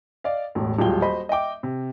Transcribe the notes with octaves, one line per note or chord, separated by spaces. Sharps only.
D5 D#5 F5
E1 A1 A2
D#1 F#3 G#3 F4 G5 G7
F#4 C5 D#5 B5
D#5 E5 G5 D6
C3